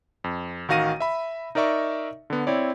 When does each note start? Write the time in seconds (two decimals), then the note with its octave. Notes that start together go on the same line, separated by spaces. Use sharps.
0.24 F2
0.68 A1 D#3 F#4 F5 A#6 D#7
1.00 E5 B5
1.55 D#4 A#4 D5 E5 C#6
2.30 D3 B3
2.47 C4 E4 C#5 D5